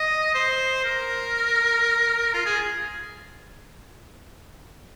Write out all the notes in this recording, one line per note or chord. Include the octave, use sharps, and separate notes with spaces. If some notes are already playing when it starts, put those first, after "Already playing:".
Already playing: D#5
C5
A#4
F4
G#4